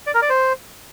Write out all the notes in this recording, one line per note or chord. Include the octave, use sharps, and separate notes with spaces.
D5
A#4
D5
C5